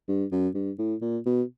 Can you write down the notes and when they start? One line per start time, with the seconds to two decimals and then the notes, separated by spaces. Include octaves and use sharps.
0.08 G2
0.32 F#2
0.55 G2
0.78 A2
1.01 A#2
1.26 B2